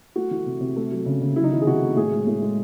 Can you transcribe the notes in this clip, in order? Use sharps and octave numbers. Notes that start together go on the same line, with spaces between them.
A3 F#4
E3
C3
C3
A3
F#3
C#3
C#3
F#3 E4
D#4
D#3 E4
G#4
C3 F#4
A3
A2 G#4
G#3
A2
G#3